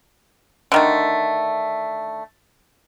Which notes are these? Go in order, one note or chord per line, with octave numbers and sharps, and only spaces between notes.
D3 D#3 A3